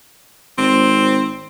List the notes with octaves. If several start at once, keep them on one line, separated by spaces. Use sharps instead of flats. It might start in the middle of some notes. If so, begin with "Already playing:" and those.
G#1 C4